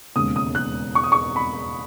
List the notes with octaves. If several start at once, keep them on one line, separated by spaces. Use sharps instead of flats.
E1 D#2 C#3 G#3 D#6
D#6
F#6
C#6
D#6
C#6
B5